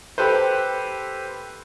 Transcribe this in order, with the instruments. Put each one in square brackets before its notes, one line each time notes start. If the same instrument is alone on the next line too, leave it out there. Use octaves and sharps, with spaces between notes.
[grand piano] G4 A4 B4 C5